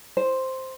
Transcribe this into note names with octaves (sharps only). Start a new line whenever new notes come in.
C5